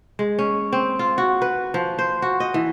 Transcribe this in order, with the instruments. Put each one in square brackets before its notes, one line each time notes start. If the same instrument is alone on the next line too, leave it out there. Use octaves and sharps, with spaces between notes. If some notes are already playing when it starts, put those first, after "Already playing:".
[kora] G#3
C#4
C4
F4
F#4
B4
F3
C5
F#4
D#5
E3